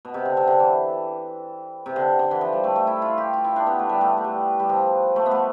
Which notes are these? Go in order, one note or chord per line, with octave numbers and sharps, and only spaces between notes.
B2
C3
D3
C3
D3
E3
C3
D3
D3
E3
F3
G3
A3
A3
E4
F4
G4
F4
E4
D4
B3
A3
G3
A3
A3
G3
G3
F3
A3
B3
A3